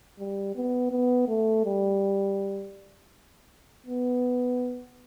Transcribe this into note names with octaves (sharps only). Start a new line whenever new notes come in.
G3
B3
B3
A3
G3
B3